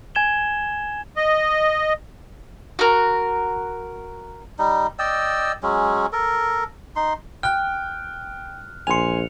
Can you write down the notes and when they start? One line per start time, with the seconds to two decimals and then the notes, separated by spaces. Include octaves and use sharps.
0.15 G#5 G#6 E7 G7
1.16 D#5
2.79 F#4 A#4
4.59 G3 D#4
4.99 D5 D#5 G5 E6
5.63 F#3 G#3 C#4
6.13 A4 A#4
6.96 D#4 C6
7.43 G5 F6 F#6
8.87 A#1 G#5 C6 C#7 F7